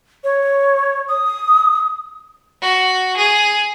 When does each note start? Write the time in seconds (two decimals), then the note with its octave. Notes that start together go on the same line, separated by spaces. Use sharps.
0.24 C#5
1.08 D#6
2.62 F#4
3.17 G#4